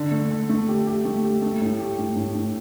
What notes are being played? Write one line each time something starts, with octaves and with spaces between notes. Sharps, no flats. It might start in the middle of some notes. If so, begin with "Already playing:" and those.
Already playing: D3
A3
D3
A3
G4
G4
A3
G4
A3
A2
G4
A2
A2
A2